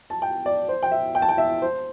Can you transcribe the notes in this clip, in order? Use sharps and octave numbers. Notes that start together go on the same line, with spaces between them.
A5
G5
D5
C5
G5
E5
G5
A5
G5
E5
C5